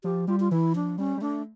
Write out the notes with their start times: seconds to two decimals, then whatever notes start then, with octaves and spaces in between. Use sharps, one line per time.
0.04 F3 G4
0.28 G3 F4
0.40 F4
0.51 E3 E4
0.75 F3 D4
0.98 G3 C#4
1.17 G3
1.21 A3 D4